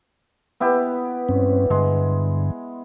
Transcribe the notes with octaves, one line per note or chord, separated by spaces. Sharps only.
B3 E4 G4
G2 C4 C#4
G2 D3 G#3